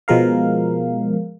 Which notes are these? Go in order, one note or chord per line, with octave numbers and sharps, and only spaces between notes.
B2 F3 G#3 A#4 F5